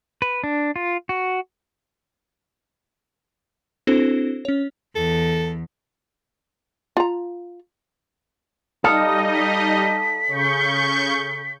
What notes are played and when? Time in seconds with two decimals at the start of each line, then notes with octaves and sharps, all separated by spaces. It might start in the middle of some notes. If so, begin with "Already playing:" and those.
0.22 B4
0.44 D4
0.76 F4
1.09 F#4
3.87 C4 D4 E4 F#4 A4 C5
4.45 C#4 C#5
4.95 E2 A4
6.97 F4 A#5
8.84 G3 D#4 A4 D#5 F5 D#6
9.35 B6
10.27 C#3 C#6 G6